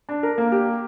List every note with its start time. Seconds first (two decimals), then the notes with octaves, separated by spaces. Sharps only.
0.09 D4
0.23 A#4
0.38 A#3
0.52 G4